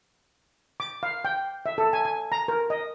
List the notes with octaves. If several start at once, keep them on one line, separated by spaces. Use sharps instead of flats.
D6
F5
G5
E5
A4
G#5
G#5
A#5
A#4
D#5